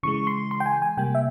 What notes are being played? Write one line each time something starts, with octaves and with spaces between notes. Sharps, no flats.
C#3 E3 G#3 C#6
C6
C6
G5
G#5
G#5
C3 G3 A#3 G5
E5